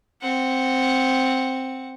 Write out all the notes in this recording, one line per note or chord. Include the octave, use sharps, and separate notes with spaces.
C4 F#5